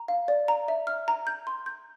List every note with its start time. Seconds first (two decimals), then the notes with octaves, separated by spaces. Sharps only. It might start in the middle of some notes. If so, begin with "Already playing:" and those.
Already playing: A#5
0.08 F5
0.28 D5
0.48 A#5
0.68 E5
0.87 F6
1.08 A#5
1.27 G6
1.47 C6
1.66 G6